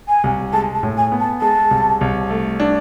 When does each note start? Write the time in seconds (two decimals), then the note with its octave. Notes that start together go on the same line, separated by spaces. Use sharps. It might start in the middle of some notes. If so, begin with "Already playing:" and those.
0.08 G#5
0.24 C2
0.53 G#3 A5
0.74 A5
0.83 A2
0.97 G#5
1.12 B3
1.20 A5
1.41 G#3 A5
1.71 C2
2.01 C2
2.30 A3
2.60 D4